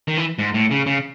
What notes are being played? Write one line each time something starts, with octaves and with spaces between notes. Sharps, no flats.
D#3
E3
G#2
A2
C#3
C#3